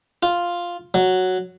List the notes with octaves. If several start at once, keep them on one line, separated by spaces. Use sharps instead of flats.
F4
F#3